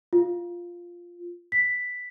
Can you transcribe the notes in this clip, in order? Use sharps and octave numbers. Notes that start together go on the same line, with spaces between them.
F4
B6